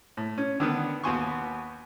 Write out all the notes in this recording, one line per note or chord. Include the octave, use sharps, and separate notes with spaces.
A2
C#4
D3 D#3 B3
D#2 B3 F#4 G#5 C6 C#6